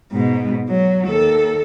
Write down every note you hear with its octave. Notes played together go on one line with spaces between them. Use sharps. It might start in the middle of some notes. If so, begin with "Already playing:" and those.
G#2 B2
F#3
D#2 A4